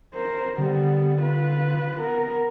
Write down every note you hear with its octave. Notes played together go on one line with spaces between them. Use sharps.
A#4 C5
D3 G3 B3
F4 B4
B3 A#4